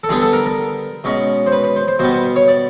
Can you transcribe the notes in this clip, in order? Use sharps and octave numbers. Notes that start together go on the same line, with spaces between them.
A4
D3 G3 B3 D4 G#4
A4
A#4
A#4
B2 G#3 C#4
C5
B4
B4
C5
C5
B2 G3 B3 C5
C5
C#5
D5